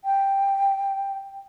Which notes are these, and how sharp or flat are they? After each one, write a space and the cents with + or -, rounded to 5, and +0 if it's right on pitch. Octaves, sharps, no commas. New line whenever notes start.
G5 +5